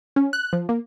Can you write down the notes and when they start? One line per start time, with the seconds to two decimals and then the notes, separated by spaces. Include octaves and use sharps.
0.16 C#4
0.33 F#6
0.53 F3
0.69 A#3